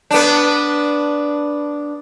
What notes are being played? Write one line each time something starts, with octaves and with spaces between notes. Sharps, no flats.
B3 D4